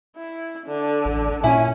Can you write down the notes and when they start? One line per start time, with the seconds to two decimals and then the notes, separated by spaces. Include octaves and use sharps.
0.17 E4
0.67 D3
1.05 A1
1.44 A#2 C#4 E4 G#5